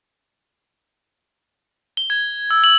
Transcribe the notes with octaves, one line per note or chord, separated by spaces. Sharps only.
G7
G#6
E6
F#7